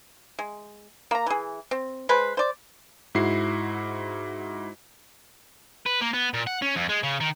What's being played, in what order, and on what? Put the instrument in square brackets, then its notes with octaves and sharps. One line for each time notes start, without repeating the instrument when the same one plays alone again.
[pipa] G#3
A#3 A#5
E3 G#4
C4
G#3 B4 C5
C5 D5
[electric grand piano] G#2 E4 F#4 C7
[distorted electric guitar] B4
A#3
B3
A#2
F#5
C#4
F2
G#3
C#3
D#3